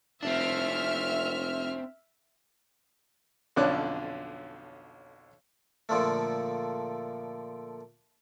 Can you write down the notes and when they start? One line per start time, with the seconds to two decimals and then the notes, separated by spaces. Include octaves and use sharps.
0.23 F1 C4 D4 E5 F6
3.56 B1 F2 D3 C#4 D5 F#6
5.89 A#2 D3 F3 A3